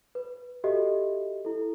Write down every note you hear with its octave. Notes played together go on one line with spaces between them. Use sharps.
B4
F#4 G4 A4 D#5 E5
E4 A4